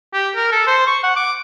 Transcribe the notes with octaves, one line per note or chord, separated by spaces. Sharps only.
G4
A#4
A4
C5
C#6
F#5
D6